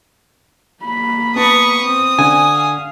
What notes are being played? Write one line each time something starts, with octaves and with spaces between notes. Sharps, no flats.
A#3 B5
B3 A5 C#6 D#6
C4 D#6
D3 G#5
F5